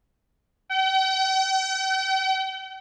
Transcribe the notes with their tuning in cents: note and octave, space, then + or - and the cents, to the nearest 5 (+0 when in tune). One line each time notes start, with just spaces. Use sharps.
G5 -45